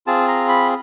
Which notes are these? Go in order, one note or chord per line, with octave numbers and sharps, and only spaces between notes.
C4 F4 G#4 A5
A#5
B5